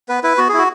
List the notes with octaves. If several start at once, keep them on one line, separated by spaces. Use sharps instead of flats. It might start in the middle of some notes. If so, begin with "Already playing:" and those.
B3 B4
E4 B4
B3 F#4
G#4
E4 F#4